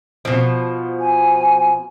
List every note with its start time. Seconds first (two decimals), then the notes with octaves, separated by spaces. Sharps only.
0.25 B2 F3
1.00 G#5